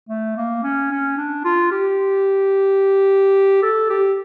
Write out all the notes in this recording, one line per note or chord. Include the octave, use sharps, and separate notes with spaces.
A3
A#3
C#4
C#4
D4
F4
G4
A4
G4